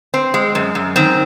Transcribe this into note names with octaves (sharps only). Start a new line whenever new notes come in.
C4
G#3
F#2
F#2
D#3 C4